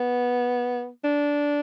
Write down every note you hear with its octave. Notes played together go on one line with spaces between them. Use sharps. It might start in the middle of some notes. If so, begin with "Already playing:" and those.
Already playing: B3
D4